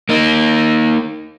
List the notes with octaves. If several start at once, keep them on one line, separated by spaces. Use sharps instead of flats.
A#3 D#4